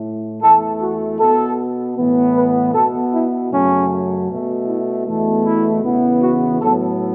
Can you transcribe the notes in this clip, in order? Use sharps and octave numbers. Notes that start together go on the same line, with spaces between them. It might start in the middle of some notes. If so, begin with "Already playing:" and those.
Already playing: A2 A3
E2 E3 A3 A4
F#4
B2 B3 A4
A2 E3 B3
B4
B2 B3 A4
E4
F#2 C#3 F#3 A3 C#4
B2
A3
E4
E2 B2 A3
E4
E2 C#3 E3 B3
F#4
A2 F#3 B3 A4